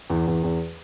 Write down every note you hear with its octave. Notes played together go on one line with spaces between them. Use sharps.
E2
E2
E2